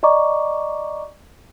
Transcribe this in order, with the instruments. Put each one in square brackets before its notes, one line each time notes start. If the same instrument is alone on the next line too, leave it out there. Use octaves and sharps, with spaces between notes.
[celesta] D5 D#5 A#5 C#6 D6